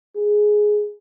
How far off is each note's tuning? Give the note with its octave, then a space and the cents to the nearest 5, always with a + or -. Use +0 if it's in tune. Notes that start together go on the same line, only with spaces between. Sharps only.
G#4 +10